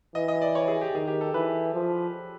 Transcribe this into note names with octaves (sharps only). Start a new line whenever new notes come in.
E3 D#5
D#5
D5
C#5
G#4
G4
D#3 G#4
G4
A4
E3 B4
F3